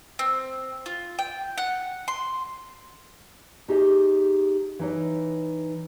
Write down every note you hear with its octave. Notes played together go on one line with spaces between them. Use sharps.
C4
F4
G5
F#5
C6
D#4 G4 G#4 D#5 E5
E3 D#4 C#5